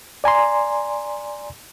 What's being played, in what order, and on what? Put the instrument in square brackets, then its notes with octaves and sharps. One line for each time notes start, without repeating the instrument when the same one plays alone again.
[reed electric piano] D5 G#5 A#5 C6